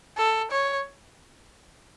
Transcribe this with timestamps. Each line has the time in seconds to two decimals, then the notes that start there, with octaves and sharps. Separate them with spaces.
0.17 A4
0.51 C#5